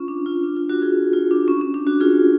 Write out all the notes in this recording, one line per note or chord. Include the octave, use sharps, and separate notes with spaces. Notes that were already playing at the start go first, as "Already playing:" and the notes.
Already playing: C#4 F4
D4
F4
D4
F4
D4 F#4
F4 G#4
F4
D4
C#4
C#4
D4
D4 F#4
F4 G#4